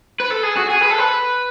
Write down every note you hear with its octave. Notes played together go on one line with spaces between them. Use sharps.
B4
A4
G#4
F#4
G#4
B4
A4
B4